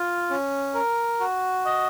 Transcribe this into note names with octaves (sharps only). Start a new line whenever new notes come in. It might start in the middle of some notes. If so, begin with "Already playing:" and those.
Already playing: F4
C#4
A#4
F#4
D#5